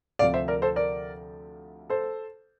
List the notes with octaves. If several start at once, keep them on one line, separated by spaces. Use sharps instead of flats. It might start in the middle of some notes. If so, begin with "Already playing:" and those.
D2 C3 F3 D5 F5
C5 E5
A#4 D5
A4 C5
A#4 D5
A4 C5